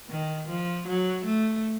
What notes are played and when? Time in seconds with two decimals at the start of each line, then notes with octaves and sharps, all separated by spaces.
0.10 D#3
0.49 F3
0.88 F#3
1.25 A3